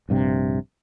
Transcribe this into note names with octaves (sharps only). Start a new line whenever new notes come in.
A#1 G2 C3